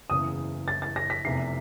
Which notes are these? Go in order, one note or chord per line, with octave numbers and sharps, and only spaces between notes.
F#1 E2 C#3 D#6
A6
A6
A#6
B6
F1 E2 C3 E3 C7